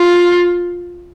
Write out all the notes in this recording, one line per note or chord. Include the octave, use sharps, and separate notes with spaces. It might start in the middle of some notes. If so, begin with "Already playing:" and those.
Already playing: F4